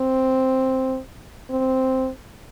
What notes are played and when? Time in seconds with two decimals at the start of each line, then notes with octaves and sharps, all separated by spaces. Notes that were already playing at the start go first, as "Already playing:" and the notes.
Already playing: C4
1.51 C4